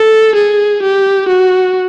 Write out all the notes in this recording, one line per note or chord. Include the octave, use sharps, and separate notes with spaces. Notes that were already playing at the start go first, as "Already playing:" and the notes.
Already playing: A4
G#4
G4
F#4